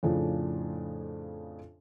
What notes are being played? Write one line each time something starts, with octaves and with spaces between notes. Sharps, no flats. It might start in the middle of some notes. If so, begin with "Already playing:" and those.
F2 A2 C#3 F3 D4